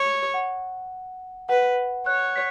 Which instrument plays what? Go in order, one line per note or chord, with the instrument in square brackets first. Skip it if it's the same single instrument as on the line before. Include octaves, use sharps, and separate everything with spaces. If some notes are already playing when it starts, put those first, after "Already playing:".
Already playing: [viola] C#5
[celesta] F#5
[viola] B4 [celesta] F#5
[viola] C#5 [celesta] F#6
[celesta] B6